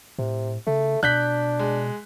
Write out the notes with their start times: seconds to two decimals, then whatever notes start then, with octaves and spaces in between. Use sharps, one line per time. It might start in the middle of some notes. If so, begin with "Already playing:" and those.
0.19 A2 C3
0.67 C#3 A3
1.03 B2 D4 F#6 G6 B6
1.59 G#3